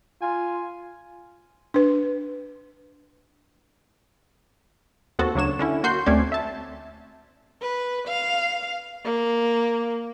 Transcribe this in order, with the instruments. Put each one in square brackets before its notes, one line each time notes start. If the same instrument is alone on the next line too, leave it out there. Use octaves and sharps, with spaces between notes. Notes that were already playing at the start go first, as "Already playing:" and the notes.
[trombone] F4 [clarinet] G#5
[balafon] D4 B4
[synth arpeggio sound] D#2 B3 C4 F#4 A4
D2 C#3 F#3 D4 C#5 E7
D3 C#4 E4
A#3 F#4 C6 G6 C7
D2 A3 C4 C#4 D5 G#6
E5 A5
[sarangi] B4
F5
A#3